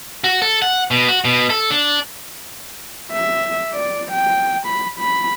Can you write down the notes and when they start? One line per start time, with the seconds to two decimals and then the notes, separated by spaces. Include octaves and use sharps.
0.24 F#4
0.42 A4
0.62 F#5
0.91 B2
1.09 F#4
1.25 B2
1.50 A4
1.70 D4
3.12 E5
3.74 D5
4.12 G5
4.66 B5
4.99 B5